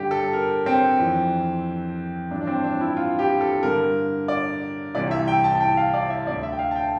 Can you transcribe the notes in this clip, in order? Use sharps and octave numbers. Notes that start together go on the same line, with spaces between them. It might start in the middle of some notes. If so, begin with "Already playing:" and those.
Already playing: G2 D3 G4
A4
A#4
C4
F2 E3
G2 E3 D4
D4
C4
D4
E4
F4
G4
A4
G2 D3 A#4
D5
C2 C3 E3 D5
E5
G5
A5
A5
G5
F5
D5
E5
D2 D3 D5
E5
G5
F5
A5
G5